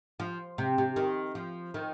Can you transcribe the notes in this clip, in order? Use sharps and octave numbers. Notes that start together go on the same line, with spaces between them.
F3
C3
C3
D#3
F3
D#3